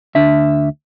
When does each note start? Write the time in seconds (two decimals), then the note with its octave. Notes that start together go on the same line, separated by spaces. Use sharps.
0.15 D2 D4 E5